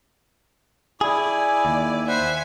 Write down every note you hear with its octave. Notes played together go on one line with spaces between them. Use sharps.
E4 G#4 D5 G#5
D#2
C5 E5 F#5 G#5